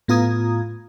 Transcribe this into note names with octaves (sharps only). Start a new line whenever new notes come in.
A2 B3 F4 A#5 D#6 G#6